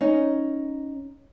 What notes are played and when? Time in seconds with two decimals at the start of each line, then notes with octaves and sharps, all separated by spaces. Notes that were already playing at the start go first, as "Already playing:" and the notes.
0.01 C#4 D#4